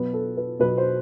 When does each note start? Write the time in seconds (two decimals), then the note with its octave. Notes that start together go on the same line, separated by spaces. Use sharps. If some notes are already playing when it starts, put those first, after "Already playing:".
Already playing: B2 F#3 B3 B4
0.13 A4
0.37 B4
0.59 B2 F#3 B3 B4
0.78 C5